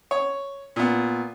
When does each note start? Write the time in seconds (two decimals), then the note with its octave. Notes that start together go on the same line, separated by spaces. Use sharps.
0.11 C#5
0.76 A#2 B3